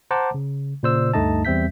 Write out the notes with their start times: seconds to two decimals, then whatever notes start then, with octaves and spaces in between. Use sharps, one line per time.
0.11 C5 F#5 A5 A#5 D6
0.34 C#3
0.83 A#2 C#3 C5 D5 E6
1.14 D2 G2 A3 D#4 D#5 A5
1.45 E2 G3 C4 E5 G6 B6